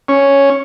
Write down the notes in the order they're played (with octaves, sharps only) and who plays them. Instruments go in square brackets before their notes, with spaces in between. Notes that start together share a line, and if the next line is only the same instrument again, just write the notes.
[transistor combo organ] C#4